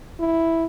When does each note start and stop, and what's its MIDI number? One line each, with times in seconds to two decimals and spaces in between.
0.20 0.66 64